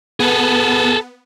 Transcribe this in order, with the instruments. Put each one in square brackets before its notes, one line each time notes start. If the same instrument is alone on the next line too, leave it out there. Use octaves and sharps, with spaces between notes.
[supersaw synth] B3 [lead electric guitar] G#4 A4